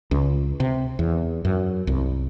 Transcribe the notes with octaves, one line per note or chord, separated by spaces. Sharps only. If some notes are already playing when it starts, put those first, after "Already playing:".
C#2
C3
E2
F#2
C2